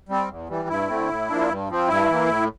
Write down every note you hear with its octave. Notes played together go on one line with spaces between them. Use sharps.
G3 C4
E2
E3 G3
G2 E4
D3 A3 C4
A2
F3 A#3 D4
G2
F3 C4
G2 E4
E3 A#3
A2